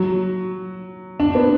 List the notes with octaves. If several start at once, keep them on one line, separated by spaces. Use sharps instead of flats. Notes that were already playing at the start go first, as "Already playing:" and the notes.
Already playing: F#3
D4
B3